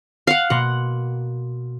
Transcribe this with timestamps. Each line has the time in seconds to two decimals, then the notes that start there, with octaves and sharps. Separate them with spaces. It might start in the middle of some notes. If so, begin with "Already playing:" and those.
0.27 F5 F#5
0.50 B2 A#3 F#5 C6